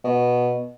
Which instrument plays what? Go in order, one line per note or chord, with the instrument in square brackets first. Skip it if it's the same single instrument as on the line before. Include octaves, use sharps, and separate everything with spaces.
[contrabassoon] B2